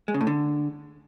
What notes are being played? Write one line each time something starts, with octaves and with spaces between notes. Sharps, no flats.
G#3
C#3
A2
D3